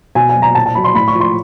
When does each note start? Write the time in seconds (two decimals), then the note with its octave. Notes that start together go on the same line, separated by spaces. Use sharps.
0.15 B2 G#5
0.29 G#5
0.35 F#3
0.42 A#5
0.55 A#2 A5
0.66 A5
0.75 F#3 B5
0.84 C6
0.95 A2 B5
1.08 C#6
1.15 F3
1.20 C6